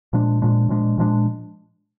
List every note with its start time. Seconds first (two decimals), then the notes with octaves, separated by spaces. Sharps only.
0.13 A#2 F3 G#3 D4
0.42 A#2 F3 G#3 D4
0.69 A#2 F3 G#3 D4
0.98 A#2 F3 G#3 D4